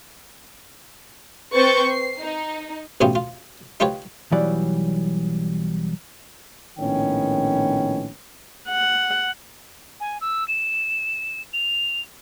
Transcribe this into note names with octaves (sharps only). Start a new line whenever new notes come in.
C4 B4 C5 C#6 G6 A6
C7
D#4
A1 B2 C#4 E4 F4 G4
F4
D#4 F4 G4 B4 C#5
B1 E3 F#3 G3 D5
A#1 A2 D#3 B3 C#4 G5
F#5
G#5
E6
E7
F7